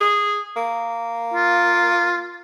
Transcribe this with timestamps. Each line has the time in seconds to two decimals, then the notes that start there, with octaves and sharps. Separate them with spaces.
0.01 G#4
0.56 A#3
1.34 F4